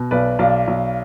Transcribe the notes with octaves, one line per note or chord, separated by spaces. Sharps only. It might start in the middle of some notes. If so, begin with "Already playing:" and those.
Already playing: B2
B1 B4 D5
B1 D5 F5
B1